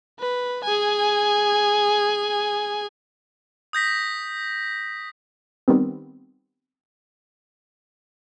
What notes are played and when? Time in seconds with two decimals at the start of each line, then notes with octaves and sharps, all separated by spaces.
0.20 B4
0.64 G#4 G#5
3.73 D#6 G6 A#6 B6
5.68 D#3 G3 B3 C4